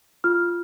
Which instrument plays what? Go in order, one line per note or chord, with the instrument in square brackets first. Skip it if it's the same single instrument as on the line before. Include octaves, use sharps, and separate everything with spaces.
[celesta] F4 F6